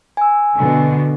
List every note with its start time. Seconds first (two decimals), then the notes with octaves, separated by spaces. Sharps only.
0.17 G#5 E6
0.57 B2 D3